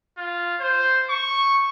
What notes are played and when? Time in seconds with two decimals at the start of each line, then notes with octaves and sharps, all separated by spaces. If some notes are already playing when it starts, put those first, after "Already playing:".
0.18 F4
0.60 C5
1.10 C#6